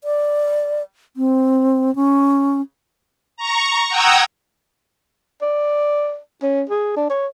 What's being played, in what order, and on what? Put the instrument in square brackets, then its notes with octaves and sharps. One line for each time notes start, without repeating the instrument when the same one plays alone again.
[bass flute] D5
C4
C#4
[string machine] A#5 C#6
F#5 G5 A#5 D#6 E6 G#6
[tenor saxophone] D5
C#4
G#4
D4
C#5